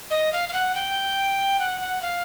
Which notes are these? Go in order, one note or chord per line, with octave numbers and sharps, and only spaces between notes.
D#5
F5
F5
F#5
G5
F#5
F#5
F5